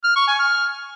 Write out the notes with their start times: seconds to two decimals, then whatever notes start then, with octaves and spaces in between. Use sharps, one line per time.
0.04 F6
0.16 C#6
0.28 G#5
0.39 F6